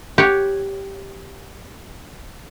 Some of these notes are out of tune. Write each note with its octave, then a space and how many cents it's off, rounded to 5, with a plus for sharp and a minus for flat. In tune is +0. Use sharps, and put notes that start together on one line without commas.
G4 +0 C#5 +0 F#5 +0